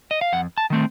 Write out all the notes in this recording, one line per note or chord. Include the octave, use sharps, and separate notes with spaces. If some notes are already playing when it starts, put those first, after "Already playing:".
D#5
F5
F2 F#5
A5
D#3 A3 C4